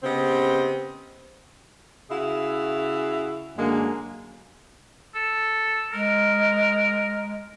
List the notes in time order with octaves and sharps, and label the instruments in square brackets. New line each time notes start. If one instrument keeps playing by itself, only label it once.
[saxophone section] C#3 B3 C4 G4 C5 D#5
C#3 E4 F#4 G#4 E5 F5
F#2 D3 G#3 A#3
[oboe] A4
[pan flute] G#3 [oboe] A#4